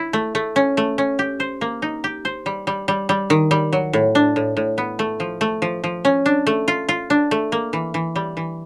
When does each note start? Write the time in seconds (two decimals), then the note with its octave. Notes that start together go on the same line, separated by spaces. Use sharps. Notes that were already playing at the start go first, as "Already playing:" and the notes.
Already playing: E4
0.13 A3
0.35 A3
0.56 C#4
0.77 A3
0.98 C#4
1.19 G4
1.40 C5
1.61 A#3
1.82 D#4
2.04 G4
2.25 C5
2.46 G3
2.67 G3
2.88 G3
3.09 G3
3.30 D#3
3.51 G3
3.73 F#3
3.93 A2
4.15 D4
4.36 A2
4.57 A2
4.78 B3
4.99 A3
5.20 F3
5.41 A3
5.62 F3
5.84 F3
6.05 C#4
6.26 D4
6.47 A3
6.68 F4
6.89 F4
7.10 D4
7.31 A3
7.52 A#3
7.73 E3
7.94 E3
8.16 G3
8.37 E3